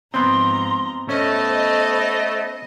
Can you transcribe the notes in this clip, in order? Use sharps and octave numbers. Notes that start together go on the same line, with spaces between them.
G#2 F3 B3 C4 A#5 C6
A3 B3 C#4 C5 D#5